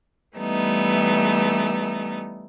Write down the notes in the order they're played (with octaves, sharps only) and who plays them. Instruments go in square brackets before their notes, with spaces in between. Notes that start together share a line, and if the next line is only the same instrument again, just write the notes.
[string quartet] E3 G3 A3 B3 D#4